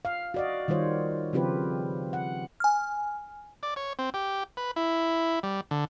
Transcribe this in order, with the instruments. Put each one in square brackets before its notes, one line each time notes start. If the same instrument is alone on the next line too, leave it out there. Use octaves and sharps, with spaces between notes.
[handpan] F5
F#4 D5 D#5
D#3 G3 F4 C5 C#5
C#3 F3 C4 F4 G4 B4
F#5
[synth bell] G#5 F6
[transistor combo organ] D5
C#5
C4
G4
B4
E4
G3
D3